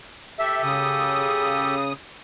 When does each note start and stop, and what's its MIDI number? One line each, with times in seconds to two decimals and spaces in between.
0.39 1.75 67
0.39 1.75 69
0.39 0.62 76
0.63 1.93 49
0.63 1.93 87